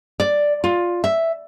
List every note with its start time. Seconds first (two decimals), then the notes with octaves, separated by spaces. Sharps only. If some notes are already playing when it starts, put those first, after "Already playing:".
0.20 D5
0.64 F4
1.04 E5